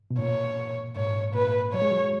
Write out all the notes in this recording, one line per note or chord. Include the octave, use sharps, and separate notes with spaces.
B2
A#2 C#5
G#2 C#5
A#2 B4
F#3 C#5
G#3
F#3